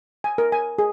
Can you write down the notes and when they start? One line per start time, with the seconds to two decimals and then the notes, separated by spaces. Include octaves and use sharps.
0.24 G#5
0.38 A#4
0.52 G#5
0.79 G#4